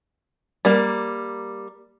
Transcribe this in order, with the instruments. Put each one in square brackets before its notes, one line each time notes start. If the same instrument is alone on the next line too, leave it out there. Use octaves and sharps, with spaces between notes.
[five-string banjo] G3 A#3